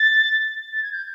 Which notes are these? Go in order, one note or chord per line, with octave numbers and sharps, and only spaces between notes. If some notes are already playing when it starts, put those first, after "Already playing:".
Already playing: A6
A6
G#6
G6